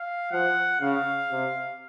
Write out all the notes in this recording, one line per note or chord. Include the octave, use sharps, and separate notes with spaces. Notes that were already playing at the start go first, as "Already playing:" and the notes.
Already playing: F5
F3 F#5
C#3 F5
C3